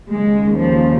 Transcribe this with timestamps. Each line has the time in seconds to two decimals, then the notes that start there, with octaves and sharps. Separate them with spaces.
0.11 D#2 C#3 G#3
0.60 F3